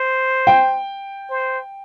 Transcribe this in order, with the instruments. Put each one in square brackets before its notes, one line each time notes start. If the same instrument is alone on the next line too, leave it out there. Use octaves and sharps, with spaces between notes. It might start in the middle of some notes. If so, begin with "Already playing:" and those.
Already playing: [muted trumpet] C5
[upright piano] G5
[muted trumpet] C5